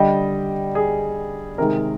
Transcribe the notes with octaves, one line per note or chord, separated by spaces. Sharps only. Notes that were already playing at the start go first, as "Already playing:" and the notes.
Already playing: D3 G3 D#5 G5
G#4
C3 D#3 G#3 A#4